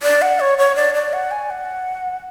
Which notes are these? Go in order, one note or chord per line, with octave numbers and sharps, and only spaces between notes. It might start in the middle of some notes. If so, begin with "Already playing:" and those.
D5
F#5
C#5
C#5
D5
D5
F#5
G#5
F#5